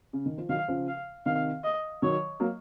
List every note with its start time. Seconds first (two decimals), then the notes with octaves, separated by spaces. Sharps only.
0.13 C#3
0.26 D#3
0.38 F3
0.49 D#3 F#3 F5
0.68 C#3 F3
0.88 F5
1.26 C3 D#3 F5
1.64 D#5
2.02 D#3 F#3 C#5
2.40 F#3 A#3